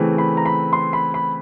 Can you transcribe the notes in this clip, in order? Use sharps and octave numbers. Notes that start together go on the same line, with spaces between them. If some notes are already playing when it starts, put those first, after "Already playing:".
Already playing: C#3 E3 A3 C4
B5
A#5
B5
C6
B5
B5